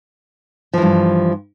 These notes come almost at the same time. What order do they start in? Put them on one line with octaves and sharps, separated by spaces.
F3 E3 G2